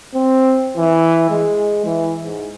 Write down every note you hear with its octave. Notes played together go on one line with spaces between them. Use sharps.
C4
E3
G#3
E3
G#2